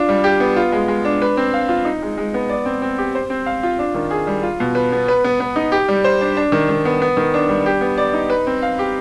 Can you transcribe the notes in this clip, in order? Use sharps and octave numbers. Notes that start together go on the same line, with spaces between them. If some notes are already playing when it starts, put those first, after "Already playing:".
Already playing: D4 F4
G3
G4
B3
F4
G#3
G#3
D4
B4
C4
F5
F4
D#4
G#3
G#3
B3
D5
C4
C4
G4
C5
C4
F5
F4
D4
D#3
G#4
G3
F4
B2
B4
B3
B4
B3
B3
D#4
G4
G3
C5
D4
D4
D#3
D#3
B3
B3
D#3
D4
G3
G4
B3
D5
D#4
B4
C4
F5
G4